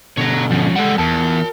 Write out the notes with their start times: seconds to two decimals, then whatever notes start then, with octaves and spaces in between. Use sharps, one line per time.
0.17 B2 D3 C#5 A#5
0.52 F3 C#4
0.76 G3 G#3 A4 F#5
0.98 E2 A#4 A5